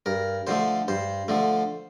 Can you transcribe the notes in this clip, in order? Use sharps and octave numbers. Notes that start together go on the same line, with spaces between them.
G2 A#4
D3 F3 A3 C5
G2 C5
D3 F3 A3